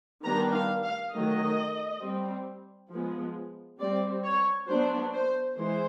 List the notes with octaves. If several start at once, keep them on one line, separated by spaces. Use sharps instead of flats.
D#3 G3 B3 D4 A#5
F5
F5
D#3 F#3 A3 D#5
G3 C4
F3 G#3 B3
G3 C4 D5
C#5
F#3 B3 D4 C5
C5
E3 G#3 C5